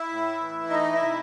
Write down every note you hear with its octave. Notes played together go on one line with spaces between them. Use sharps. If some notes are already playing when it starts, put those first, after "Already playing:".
Already playing: E4 E5
A2
E3
A3 D#4 D#5
E4 E5
C3